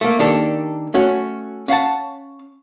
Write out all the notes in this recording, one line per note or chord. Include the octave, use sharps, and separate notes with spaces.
A3 A#3
D#3 A#3 D4 G4 A4
A3 C#4 F#4
C#4 F5 F#5 A5